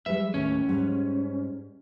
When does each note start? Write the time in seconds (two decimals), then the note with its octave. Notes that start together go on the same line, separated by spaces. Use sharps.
0.06 G3 G#3 B4 E5
0.34 D#2 A2 C#4
0.68 G#2 G3 F#5